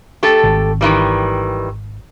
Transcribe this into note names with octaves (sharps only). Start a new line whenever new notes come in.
A3 G4 A4
G#1
D#3 E3 G3